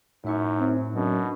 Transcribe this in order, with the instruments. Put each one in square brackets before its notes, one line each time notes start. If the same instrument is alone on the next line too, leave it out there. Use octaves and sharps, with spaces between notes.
[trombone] F#2 [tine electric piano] A2 E5 C#6 [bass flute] D#4
[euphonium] C4
[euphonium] F#2 [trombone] B2 [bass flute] D4